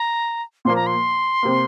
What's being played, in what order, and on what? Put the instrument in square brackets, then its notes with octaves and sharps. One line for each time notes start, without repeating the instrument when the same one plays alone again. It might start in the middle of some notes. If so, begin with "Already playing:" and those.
Already playing: [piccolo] A#5
[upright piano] A#2 F3 A#3 [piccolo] C6
[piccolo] A#5
C6
[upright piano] C3 A#3